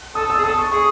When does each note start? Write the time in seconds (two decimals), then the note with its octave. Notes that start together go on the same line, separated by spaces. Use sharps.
0.15 A4 D#6
0.30 E6
0.38 G#4
0.44 A4 D#6
0.58 C#6
0.71 G#4 C#6